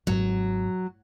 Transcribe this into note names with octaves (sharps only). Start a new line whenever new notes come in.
G#1 F#3